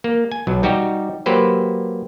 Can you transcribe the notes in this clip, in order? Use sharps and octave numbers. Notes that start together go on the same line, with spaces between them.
A#3
G#5
B1 F#3
G3 D#4 F#4 G4
F#3 A#3 G4 B4 C5